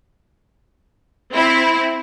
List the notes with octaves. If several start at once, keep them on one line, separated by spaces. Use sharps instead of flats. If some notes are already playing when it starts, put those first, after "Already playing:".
C4 E4